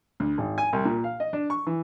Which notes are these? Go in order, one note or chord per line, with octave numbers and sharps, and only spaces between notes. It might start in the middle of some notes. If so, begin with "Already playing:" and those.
D2
G#1
G#5
C2
A#2
F5
D#5
D4
C#6
E3